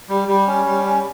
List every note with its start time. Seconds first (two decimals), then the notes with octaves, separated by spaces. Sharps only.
0.09 G3
0.28 G3
0.47 C#4
0.66 G3
0.85 C#4